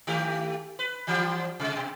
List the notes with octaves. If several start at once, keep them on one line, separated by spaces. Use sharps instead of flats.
D#3 A3 G4
B4
E3 F3 G3
C3 G#3
B2